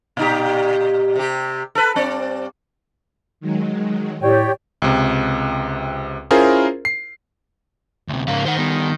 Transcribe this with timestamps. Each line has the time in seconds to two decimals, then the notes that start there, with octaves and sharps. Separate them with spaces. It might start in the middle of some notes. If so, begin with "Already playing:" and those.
0.17 A#2 D#4 G4
1.16 C3 G4
1.75 A4 B4
1.95 G2 C4 D5
3.41 D#3 F#3 G#3
4.22 A2 G4 C#5 D5 G5
4.82 C#2 C3
6.31 C#4 E4 F4 G#4 A#4 C5
6.85 C7
8.09 D2 C3
8.28 G#2 C#3 A#4 F5
8.45 D#3 C5 F#5
8.58 G3 B3